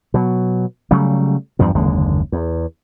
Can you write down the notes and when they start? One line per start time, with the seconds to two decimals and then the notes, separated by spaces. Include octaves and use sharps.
0.14 B2 F#3
0.91 C#3 F#3 G3 A3
1.59 E2 G2 F3
1.75 F#1 D#2 D3 G#3
2.32 E2